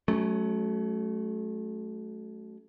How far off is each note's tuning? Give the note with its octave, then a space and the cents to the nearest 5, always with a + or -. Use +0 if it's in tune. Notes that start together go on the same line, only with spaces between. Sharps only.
F#3 +20 A3 -20 C#4 +0